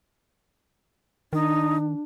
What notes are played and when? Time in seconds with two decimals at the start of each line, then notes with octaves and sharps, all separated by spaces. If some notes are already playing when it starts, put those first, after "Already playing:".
1.33 D#3 D4 D#4